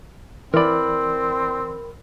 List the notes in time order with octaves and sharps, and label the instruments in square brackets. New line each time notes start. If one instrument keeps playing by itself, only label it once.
[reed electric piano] E3 D5 [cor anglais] C4 [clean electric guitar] A#4 B5